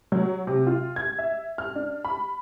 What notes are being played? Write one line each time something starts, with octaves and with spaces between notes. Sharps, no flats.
F#3
C3
F4
G#6
E5
F6
D4
B5